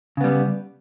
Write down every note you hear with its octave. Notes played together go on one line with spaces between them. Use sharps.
C#3 G3 B3